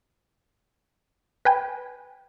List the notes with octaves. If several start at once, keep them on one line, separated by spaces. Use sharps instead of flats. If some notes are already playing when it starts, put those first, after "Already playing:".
B4 G5 G#5